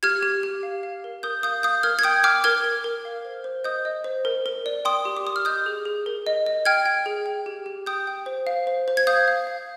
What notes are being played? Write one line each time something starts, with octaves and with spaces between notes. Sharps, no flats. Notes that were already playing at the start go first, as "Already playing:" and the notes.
G4 F6 G#6
G4
G4
F5
F5
A#4
A#4 D#6 G6
F5 D#6 G6
F5 D#6 G6
A#4 F6 G#6
G#6
G5 D#6 G6
G5 D6 F6
A#4 F6 G#6
A#4
A#4
F5
C5
C5
D#5 D#6 G6
D#5
C5
A#4
A#4
D5
G5 C6 D#6
G4
D6
G4 D#6
F6
D#5 D#6 G6
G#4
G#4
A#4
D#5
D#5
G5 F6 G#6
G5
G#4
G5
G4
G4
G5 D#6 G6
G5
C5
F5
C5
C5
G#6
F5 D#6 G6
F5
F5